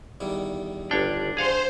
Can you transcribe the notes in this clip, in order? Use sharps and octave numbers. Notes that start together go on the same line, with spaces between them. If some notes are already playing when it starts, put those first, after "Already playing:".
E2 D#3 G3
G1 D4 C#5 G5
G#4 C5 F5 F#5